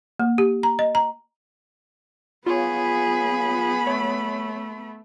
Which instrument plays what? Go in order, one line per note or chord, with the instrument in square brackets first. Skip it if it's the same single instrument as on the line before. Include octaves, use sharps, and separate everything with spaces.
[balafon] A#3
G4
A#5
D#5
A#5
[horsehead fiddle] B3 B5 [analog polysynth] F4 C#5 [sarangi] G#4
[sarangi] A3 [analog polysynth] C#5